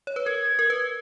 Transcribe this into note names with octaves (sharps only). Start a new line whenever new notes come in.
C#5
B4
A#4 G#6
A#4
B4